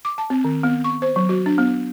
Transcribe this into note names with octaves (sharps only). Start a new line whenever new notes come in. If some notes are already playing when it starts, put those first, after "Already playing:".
D6
A5
C4
D#3
B3
C#6
C5
F#3
F#4
D4
B3